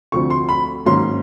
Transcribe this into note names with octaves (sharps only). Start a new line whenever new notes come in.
D2 D3 F3 A3 C4 C#6
C6
B5
G#2 D#3 F#3 A#3 C#4 C6